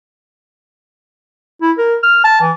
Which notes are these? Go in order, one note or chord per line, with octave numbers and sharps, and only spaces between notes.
E4
A#4
F6
A5
E3